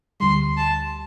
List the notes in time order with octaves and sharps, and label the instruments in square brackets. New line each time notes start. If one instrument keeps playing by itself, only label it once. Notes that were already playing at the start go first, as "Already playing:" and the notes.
[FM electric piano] D2 D3 G3 [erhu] C6
[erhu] A5